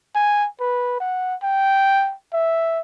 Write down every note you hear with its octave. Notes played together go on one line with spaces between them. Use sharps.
G#5
B4
F#5
G5
E5